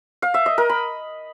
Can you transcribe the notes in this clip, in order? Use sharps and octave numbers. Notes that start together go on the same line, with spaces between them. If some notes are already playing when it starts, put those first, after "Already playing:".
F5
E5
D#5
A#4
B5